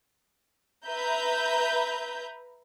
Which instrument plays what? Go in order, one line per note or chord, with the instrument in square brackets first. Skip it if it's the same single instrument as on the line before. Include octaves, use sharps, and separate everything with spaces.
[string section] B4 E5 A#5 G6